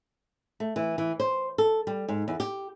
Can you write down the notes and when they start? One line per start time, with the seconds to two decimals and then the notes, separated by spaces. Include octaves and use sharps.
0.60 A3
0.76 E3
0.98 E3
1.20 C5
1.58 A4
1.87 G3
2.09 G#2
2.28 E2
2.40 G4